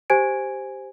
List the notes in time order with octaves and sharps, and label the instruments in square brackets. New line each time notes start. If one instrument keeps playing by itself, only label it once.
[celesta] G4 C5 G#5 G#6 D7